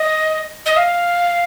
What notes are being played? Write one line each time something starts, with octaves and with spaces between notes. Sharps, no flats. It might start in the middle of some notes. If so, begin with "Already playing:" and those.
Already playing: D#5
D#5
F5